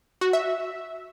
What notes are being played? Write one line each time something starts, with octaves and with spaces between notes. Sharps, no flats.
F#4
E5